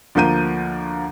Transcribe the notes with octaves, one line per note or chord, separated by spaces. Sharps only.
D2 F3 A#3 G6 D#7